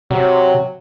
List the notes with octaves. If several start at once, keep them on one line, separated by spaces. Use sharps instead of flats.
C3 F#3